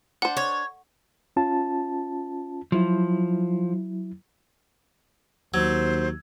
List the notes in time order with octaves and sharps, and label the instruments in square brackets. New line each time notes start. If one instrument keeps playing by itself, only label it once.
[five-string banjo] D4 C5 [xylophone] F#5
[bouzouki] C#5
[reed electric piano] C#4 F4 A5
[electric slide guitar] F3 [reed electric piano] F#3 E4
[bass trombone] D#2 [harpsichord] F#3 [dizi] C5 [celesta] E6 G#6